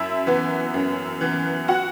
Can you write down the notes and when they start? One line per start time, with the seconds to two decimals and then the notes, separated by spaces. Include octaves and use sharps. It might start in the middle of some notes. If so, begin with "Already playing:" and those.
Already playing: F#2 E4 E5
0.27 E3 B3
0.74 F#2
1.21 E3 B3
1.68 F#4 F#5